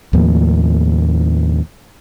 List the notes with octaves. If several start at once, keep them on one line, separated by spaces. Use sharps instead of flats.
D#2 A2 F3 A#3